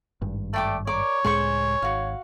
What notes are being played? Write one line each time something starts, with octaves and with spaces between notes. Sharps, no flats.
G#1 G2
A3 D5 G5 D6
A#4 C#5 D5 D6
C#2 A2 G#3 G#4 C5 C#6
G#1 F#4 F5